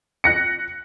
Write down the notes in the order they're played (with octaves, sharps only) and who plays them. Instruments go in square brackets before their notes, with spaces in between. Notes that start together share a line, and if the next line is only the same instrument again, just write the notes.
[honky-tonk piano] F#6 A#6 C#7